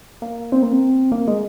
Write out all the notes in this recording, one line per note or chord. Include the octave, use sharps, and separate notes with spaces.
A#3
C4
A#3
C4
A#3
G#3